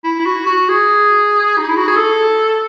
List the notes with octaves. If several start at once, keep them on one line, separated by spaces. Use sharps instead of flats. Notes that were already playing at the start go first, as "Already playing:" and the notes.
E4
E4
F#4
F#4
G#4
D#4
E4
F#4
G#4
A4